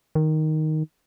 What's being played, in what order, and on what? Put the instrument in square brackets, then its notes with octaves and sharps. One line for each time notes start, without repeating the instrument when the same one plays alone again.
[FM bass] D#3